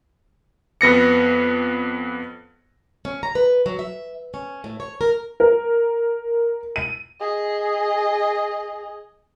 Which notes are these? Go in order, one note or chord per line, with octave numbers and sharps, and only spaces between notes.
F2 B3 A#6 C#7
C#4
A#5
B4
F#3
E5
C#4
A2
C#5
A#4
A#4
D#7
G#4 D#5